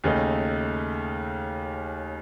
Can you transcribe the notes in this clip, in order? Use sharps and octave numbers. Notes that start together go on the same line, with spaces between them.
D#2 C#3 A3 D#4